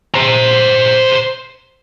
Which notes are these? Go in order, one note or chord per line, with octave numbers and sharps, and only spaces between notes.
C5 A#5